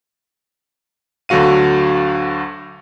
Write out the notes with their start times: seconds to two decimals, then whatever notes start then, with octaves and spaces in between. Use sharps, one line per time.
1.29 D2 D3 F#3 F#4 F5 D#7